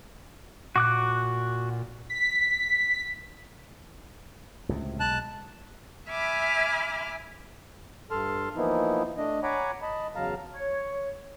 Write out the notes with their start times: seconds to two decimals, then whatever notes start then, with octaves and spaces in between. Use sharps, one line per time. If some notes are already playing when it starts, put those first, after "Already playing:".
0.76 A#2 F#4 D6 F#6
2.10 B6
4.69 C#2 A2 C3
5.00 B1 G#3 A5 F#6
6.10 E5 G#5 B5 D6 F6
8.11 G2 A4 A5 C6 F6
8.56 E3 F3 A#3 B3 D#4 E4
9.18 A3 D4 D#5
9.43 C#5 F#5 G#5 A#5 B5 D6
9.82 D#5 A5 B5
10.15 E2 C#3 F#3 F5 A5 A#5
10.53 C#5